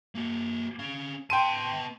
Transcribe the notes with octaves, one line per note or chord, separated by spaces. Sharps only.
A#3 F#4
C#4 F5
B3 G5 A5 C6 D#7